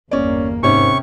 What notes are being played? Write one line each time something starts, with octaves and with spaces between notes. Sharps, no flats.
G1 E2 A#3 C#4 D5
G#2 C3 C#4 C#6